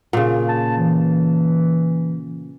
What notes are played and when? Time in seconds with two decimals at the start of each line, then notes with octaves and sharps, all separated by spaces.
0.13 A#2 C#3
0.48 A5
0.78 E3